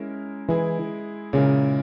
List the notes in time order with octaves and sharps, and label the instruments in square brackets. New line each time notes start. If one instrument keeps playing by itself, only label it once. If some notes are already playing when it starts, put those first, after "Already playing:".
Already playing: [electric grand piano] G#3 C#4 E4 A#4
[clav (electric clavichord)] E3 [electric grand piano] G#3 E4 G#4
[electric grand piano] A#2 G#3 E4 A#4 [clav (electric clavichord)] C#3